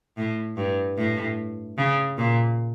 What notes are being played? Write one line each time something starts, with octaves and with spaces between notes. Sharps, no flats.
A2
G2
A2
C#3
A#2